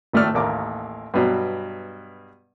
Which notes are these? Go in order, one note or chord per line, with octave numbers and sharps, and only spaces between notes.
G#1 A2 A3 A4 D5 F6
A1 D#2 A#3 D6
G2 B2 F#3